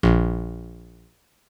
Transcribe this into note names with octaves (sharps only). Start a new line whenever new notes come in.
A#1